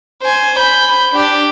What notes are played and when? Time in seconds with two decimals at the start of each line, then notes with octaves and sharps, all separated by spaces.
0.22 C5 G#5
0.59 B5 G6
1.13 D4 G4